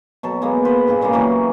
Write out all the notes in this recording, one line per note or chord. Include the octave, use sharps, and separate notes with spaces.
B2 F#3 A4
G#3 A#3 B3
B4 C5
G2 A#2 G#4
A#2 C#3 G#3 A#3
C#3 E3 F#3 G3